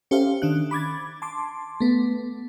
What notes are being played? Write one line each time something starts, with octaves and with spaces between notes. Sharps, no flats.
C#4 G4 A4 C5 E5 F5
D#3 D4 F#6
B5 D6 G#6 A6
A5 C6 D6
A3 B3